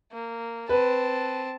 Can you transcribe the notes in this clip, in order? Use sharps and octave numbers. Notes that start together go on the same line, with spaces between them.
A#3
C4 B4 A5